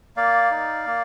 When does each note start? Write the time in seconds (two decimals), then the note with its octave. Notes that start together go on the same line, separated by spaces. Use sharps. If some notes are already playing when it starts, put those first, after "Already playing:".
0.17 A#3 D5 F5
0.51 D#4
0.86 A#3